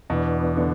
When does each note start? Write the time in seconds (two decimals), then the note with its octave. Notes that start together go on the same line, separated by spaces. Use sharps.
0.10 E2 B2 E3 B3 D4
0.57 D3